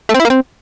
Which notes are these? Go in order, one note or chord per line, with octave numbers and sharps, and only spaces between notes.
A3
C4
E4
A#3
C4